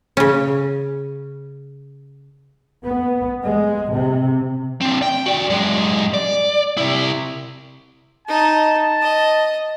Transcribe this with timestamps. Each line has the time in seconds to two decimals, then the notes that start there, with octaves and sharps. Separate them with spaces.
0.17 C#3 C#4
2.85 B3
3.45 G#3
3.92 C3
4.81 C4 D4
5.02 G5
5.26 F#4 D5
5.50 F#2 G#3
6.14 D5
6.78 C3 E4
8.28 D#4 A5
9.02 D#5